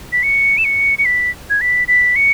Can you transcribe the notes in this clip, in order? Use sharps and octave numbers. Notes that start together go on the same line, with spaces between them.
B6
C#7
E7
C#7
C#7
B6
G#6
B6
B6
C#7